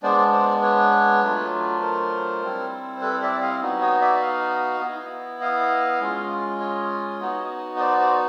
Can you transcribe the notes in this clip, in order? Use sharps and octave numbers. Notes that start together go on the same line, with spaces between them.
G#3 B3 D4 C5 D5
C5 D5
B4 C#5
F#3 A3 D4 F4
B4
A#4 C5
G3 C4 E4
C5
A4 B4
D5 E5
D#5 F5
B3 D#4 F#4
C#5 D#5
D5 E5
D#5 F5
B3 E4
D#5 F5
G#3 C#4 F4
C#5 D#5
B3 D#4 F#4
D#5
C5 D5
C5 D5